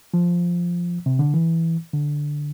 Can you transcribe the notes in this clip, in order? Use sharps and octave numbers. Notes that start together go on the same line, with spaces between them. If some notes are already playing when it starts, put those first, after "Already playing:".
F3
C3
D3
E3
D3